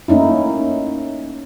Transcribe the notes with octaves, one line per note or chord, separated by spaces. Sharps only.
A3 A#3 C#4 D#4 E4